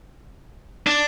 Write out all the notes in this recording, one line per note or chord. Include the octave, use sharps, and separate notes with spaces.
D4